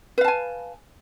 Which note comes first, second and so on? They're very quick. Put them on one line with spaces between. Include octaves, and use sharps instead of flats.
B4 F5 A5 G#5